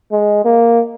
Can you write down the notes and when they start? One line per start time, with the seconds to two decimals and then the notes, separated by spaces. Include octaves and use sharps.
0.12 G#3
0.45 A#3